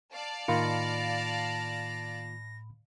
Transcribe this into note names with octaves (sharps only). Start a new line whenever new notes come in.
D5 F5 A5
A2 D#3 A#3 F4 B5 A#6 C#7